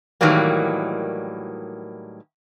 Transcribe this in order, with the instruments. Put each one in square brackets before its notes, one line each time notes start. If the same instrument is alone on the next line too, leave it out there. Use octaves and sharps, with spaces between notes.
[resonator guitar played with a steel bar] A2 D#3 E3 F#3 G3 A#3